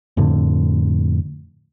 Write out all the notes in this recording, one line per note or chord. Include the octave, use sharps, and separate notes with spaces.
F2 A2 D3